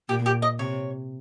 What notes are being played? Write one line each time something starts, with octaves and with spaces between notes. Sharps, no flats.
A#2 G4
G4
D#5
C3 C#5